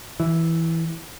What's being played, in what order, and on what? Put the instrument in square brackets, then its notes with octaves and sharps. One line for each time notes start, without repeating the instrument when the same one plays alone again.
[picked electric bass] E3